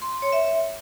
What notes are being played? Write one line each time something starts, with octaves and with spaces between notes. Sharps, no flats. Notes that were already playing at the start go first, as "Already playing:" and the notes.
C6
C6
C#5
E5